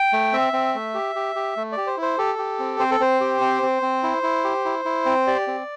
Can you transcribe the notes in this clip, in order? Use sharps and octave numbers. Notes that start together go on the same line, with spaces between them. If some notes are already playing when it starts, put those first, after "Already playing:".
Already playing: G5
A3
C4 E5
C4
A3
G4
G4
G4
A3
G4 D5
C5
E4
C5
G4 A4
G4
C4
C4 C5
A4
C4 C5
G4
C4
C4
C4
E4
E4
G4
E4
E4
C4
G4 D5
C4